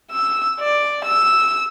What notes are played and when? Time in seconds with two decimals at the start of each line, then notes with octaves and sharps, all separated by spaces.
0.11 E6
0.60 D5
1.04 E6